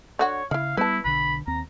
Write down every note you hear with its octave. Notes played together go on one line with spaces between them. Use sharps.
D3 F#4 C#5 F#5
C#3 D#4 E4 F5
G3 B3 E4 B4 A5
B1 D3 B5
D#2 C4 A#5